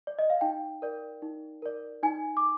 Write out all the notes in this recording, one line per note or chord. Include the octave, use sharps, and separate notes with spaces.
D5
D#5
F5
D#4 G5
A#4 D5
D#4
A#4 D5
D#4 G#5
D6